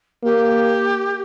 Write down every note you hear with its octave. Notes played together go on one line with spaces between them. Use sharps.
A#3 G4